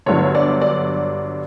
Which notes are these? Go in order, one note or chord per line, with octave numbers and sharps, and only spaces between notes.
G1 G2 D3 F#3 C#5
D5
D5